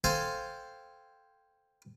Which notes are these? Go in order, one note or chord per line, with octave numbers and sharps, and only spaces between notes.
A4 C5 F5 G5 G#5